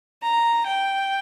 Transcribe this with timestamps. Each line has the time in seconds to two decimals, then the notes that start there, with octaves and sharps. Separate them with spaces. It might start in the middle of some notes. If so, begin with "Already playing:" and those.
0.22 A#5
0.65 G5